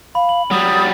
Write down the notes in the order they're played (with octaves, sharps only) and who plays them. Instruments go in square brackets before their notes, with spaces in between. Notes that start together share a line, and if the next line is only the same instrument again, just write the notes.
[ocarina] F5 [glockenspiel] B5
[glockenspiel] F#7
[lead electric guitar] F#3 G3 [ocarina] D#6
[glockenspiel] A6